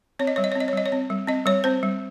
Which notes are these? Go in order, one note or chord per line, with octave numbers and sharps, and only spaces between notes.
C4 C#5
D#5
G3 C#5
D#5
C#5
C4
D#5
C#5
G3 D#5
C#5
C4
G3
C4 D#5
G3 C#5
C4 C5
G3